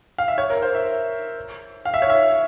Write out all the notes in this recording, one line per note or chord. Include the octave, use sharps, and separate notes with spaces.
F5
E5
C#5
A#4
C5
E5
F5
E5
C#5
E5